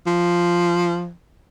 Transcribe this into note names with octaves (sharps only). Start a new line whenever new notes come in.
F3